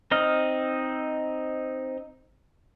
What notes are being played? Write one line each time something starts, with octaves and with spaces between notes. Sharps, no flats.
C4 D#4 D#5 D#6 F6